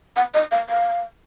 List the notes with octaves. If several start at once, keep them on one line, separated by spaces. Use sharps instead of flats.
F#5
D#5
F5
F5